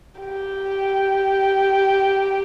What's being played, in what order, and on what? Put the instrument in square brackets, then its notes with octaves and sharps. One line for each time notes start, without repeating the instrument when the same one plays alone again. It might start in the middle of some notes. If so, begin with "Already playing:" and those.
[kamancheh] G4